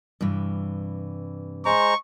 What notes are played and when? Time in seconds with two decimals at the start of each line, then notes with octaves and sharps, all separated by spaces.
0.21 G2 C3 E3
1.65 G#3 C5 A#5 C#6